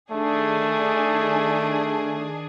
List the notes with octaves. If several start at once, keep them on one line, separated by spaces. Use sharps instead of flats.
D#3 A3 D4 G#4